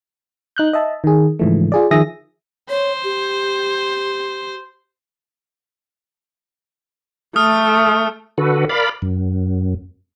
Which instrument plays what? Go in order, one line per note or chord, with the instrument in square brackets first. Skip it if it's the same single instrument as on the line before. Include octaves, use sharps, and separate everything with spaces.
[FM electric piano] D#4 F#6 G6
D#5 E5 A5
D#3 G#4
G#2 C#3 E3 F3 A3
F4 G#4 D5
D#3 F3 G#4 E5 D#6 A#6
[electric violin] C5 [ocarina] C#5
[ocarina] G4
[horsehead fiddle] A3 [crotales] D#6 F6
[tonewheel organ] D3 F#4 A4 B4
A#4 D5 F5 B5
F#2